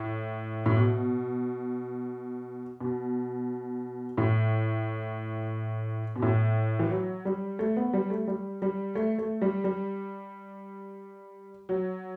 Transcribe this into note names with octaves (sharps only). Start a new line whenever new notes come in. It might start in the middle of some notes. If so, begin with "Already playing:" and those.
Already playing: A2
A2
B2
B2
A2
B2
A2
E3
F#3
G3
A3
B3
G3
A3
G3
G3
A3
A3
G3
G3
F#3